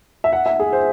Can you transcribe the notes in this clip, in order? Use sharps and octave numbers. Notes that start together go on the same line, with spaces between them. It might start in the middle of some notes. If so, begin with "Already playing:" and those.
E5
F#5
E5
G#4
C5